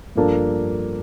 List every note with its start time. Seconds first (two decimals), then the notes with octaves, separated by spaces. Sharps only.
0.16 G2 F3 A#3 D4 A4